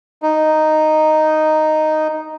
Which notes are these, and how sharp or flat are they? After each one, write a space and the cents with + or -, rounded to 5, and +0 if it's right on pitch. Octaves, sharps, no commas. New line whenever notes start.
D#4 -5